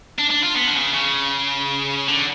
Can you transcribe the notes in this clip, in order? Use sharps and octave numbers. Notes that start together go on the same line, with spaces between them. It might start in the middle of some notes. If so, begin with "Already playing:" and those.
D4
D4
F4
B3
D3
C#3
C#3
D3